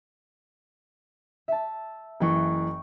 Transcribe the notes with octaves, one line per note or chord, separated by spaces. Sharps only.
E5 A5
F#1 E3 G5 C#6